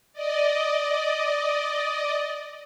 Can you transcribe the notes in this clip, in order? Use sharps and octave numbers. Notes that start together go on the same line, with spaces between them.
D5 D#5